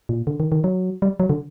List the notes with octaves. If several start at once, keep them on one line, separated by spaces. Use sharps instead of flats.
A#2
D3
D#3
D#3
F#3
G3
F#3
D3